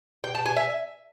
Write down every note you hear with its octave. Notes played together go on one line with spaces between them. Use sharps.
G5
A5
G#5
E5